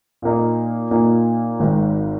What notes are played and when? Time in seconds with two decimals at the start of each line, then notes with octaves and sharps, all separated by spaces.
0.22 A#2 A#3 D#4
0.91 A#2 A#3 D#4
1.60 G#1 G#2 D#3